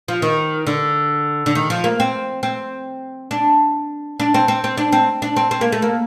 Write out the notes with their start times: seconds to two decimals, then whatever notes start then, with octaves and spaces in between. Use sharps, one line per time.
0.08 F3
0.22 D#3
0.67 D3
1.46 D3
1.55 D#3
1.70 F3
1.84 A#3
2.00 C4
2.43 C4
3.31 D4
4.20 D4
4.34 C4
4.48 C4
4.64 C4
4.77 D4
4.92 C4
5.22 D4
5.36 C4
5.51 C4
5.61 A#3
5.72 A3
5.82 A#3